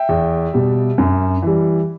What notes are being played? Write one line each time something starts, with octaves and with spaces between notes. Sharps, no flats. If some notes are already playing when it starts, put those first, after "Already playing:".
Already playing: E5 G5
E2
B2 G3
F#2
E3 G3